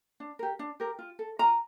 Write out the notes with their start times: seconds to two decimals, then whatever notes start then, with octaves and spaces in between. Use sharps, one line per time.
0.20 D4
0.39 G4 A#4
0.59 D4
0.80 G4 A#4
0.99 F4
1.19 A4
1.39 F4 A#5